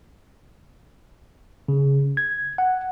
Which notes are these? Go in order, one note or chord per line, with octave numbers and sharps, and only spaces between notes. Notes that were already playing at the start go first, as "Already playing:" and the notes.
C#3
G#6
F#5